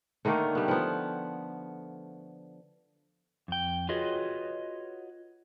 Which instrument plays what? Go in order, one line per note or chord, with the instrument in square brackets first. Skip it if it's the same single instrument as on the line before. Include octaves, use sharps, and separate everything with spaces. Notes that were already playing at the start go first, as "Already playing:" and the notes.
[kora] D3 D#3 A3 A#3
G3 B3
F3 B3
[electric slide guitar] F2 G5
F4 F#4 G#4 B4 C#5 D#5